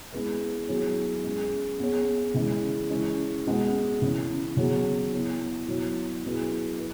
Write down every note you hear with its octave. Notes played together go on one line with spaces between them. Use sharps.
G#3 B3 E4 G#4 B4
F#3 B3 E4 G#4 C#5
G#3 C#4 G#4
B3 G#4 C#5
C#3 E3 G#3
G#3 C#4 E4
B2 G#3 B3 F#4
C#3 E3 C#4
C#3 F#3 B3 G#4 C#5
B3 E4 C#5
B2 F#3 E4 C#5
B2 F#3 E4 G#4 B4
B4